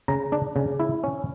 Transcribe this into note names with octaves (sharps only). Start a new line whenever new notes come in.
C#3 A#5
D4
C#3
E4
C#4